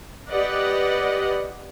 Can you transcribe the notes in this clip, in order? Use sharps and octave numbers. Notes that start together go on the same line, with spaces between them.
G4 B4 D5 D#5 F#5